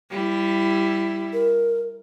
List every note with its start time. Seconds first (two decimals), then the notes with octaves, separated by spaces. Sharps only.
0.11 G3 E4
1.33 A#4